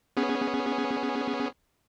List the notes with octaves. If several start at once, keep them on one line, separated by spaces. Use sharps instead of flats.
B3 C#4 G#4